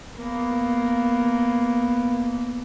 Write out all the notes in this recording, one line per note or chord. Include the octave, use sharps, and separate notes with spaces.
A#3 B3